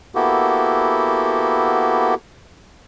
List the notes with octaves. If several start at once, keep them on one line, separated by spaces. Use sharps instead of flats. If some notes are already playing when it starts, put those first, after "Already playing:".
A#3 B3 E4 F#4 G4 A4